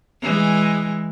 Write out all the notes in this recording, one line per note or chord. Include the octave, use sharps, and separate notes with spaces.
E3 G#3